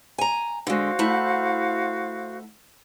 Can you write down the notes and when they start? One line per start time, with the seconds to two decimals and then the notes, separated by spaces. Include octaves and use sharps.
0.18 G#5 A#5
0.67 D3 G#3 F#4 C5 F5
0.99 A3 E4 F#5